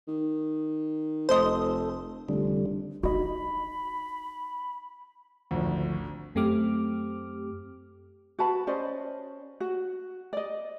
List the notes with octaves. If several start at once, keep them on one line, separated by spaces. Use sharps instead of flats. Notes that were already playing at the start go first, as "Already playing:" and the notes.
D#3
F1 A4 C5 D#5
F1 D3 G3
D#4 F#4 D#5 B5
G#1 D2 D3 F3
F#2 A3 C4 G4 D6 F6
F#4 B4 A5 B5
C#4 C5 D5 D#5
F#4
D5 D#5